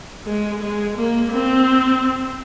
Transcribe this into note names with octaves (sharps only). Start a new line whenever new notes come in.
G#3
G#3
A#3
C4